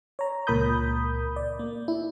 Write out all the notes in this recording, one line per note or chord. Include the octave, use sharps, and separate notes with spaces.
C#5 A#5
C#2 A#2 A#4 B5 D#6 G6
D5
A#3
E4